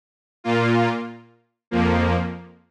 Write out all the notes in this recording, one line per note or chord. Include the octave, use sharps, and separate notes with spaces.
A#2 A#3 F4
F2 F3 A#3